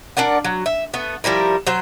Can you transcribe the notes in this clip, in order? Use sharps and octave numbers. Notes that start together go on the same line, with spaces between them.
D4 A#4 D5 F#5
F#3
E5
A3 B3
F3 G3 E4 A#4
F#3 C5